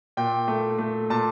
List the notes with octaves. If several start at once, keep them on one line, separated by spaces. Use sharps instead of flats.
A#2 G5
A3
A3
A#2 A5